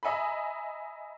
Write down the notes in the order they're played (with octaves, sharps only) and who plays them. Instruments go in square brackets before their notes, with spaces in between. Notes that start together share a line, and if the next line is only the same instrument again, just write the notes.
[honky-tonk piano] D#5 E5 G#5 A#5 B5